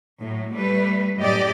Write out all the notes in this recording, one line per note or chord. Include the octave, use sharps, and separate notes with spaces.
A2 F#3
G3 A3 B4
F#2 A2 G4 D5 D#5